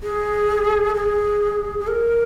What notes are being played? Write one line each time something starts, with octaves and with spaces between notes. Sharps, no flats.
G#4
G#4
G#4
A#4